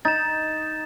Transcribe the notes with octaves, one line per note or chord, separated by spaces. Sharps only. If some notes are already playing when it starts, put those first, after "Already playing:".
D#4 A6 E7